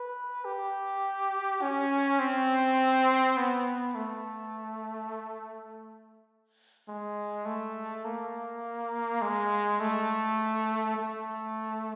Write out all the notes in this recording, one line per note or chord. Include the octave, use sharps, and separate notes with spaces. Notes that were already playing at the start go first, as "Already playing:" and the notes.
Already playing: B4
G4
C#4
C4
B3
A3
G#3
A3
A#3
G#3
A3
A3